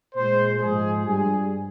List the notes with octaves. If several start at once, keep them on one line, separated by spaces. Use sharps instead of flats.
A#2 G#3 C5
G#2 F3 G#3 G#4
G2 G3 G#4